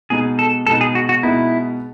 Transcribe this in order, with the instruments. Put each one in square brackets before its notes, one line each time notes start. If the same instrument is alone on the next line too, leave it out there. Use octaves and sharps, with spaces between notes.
[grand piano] B2 G#3 B3 D#4 [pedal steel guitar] G#4
[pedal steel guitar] A4
[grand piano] B2 G#3 B3 D#4 [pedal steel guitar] A4
[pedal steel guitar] G#4
F#4
F#4
[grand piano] B2 G#3 B3 D#4 [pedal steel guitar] E4